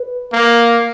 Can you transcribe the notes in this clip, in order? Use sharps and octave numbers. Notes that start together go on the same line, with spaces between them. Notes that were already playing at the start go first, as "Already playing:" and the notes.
Already playing: B4
A#3